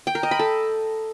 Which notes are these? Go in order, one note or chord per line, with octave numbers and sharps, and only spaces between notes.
G5
A#4
D#5
B5
A4